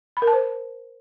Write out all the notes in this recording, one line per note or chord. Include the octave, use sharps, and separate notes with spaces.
B5
A#4
A5
C5